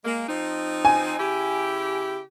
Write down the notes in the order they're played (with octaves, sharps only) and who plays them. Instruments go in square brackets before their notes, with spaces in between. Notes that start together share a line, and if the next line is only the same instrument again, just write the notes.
[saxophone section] G#3 A#3
F3 C4 D#4
[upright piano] G#5
[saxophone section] C#3 E4 G4